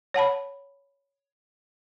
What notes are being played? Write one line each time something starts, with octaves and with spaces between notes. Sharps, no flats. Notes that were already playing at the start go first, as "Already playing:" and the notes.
C#5 F#5 A5 B5